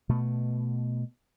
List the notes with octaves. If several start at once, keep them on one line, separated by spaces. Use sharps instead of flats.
B2 A3